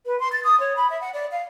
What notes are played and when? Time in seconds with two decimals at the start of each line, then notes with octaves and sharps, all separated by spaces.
0.05 B4
0.19 C6
0.32 A6
0.44 D#6
0.60 C#5
0.76 B5
0.89 E5
1.01 F#5
1.13 D5
1.31 F5